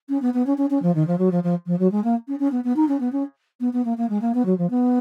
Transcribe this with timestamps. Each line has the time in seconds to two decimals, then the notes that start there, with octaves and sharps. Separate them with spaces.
0.09 C#4
0.21 B3
0.33 B3
0.46 C#4
0.57 C#4
0.70 C#4
0.82 F3
0.94 D#3
1.07 F3
1.18 F#3
1.31 F3
1.43 F3
1.66 F3
1.79 F#3
1.91 G#3
2.04 A#3
2.28 C#4
2.39 C#4
2.51 B3
2.64 B3
2.76 D#4
2.88 C#4
3.00 B3
3.12 C#4
3.60 B3
3.73 B3
3.84 A#3
3.97 A#3
4.09 G#3
4.21 A#3
4.34 B3
4.45 F#3
4.58 F3
4.70 B3